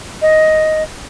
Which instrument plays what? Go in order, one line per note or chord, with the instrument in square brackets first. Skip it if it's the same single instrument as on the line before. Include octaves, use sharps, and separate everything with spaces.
[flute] D#5